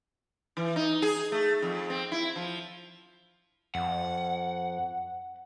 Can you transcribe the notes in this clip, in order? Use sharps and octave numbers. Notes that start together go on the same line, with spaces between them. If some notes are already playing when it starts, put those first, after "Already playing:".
E3
D#4
G#4
A3
F2
C4
E4
F3
F2 F#5